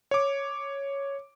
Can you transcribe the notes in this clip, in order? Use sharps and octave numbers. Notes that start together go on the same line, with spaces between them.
C#5 D6